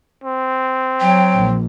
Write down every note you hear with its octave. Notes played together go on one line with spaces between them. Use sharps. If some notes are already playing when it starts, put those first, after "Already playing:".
C4
F#3 G5
A#1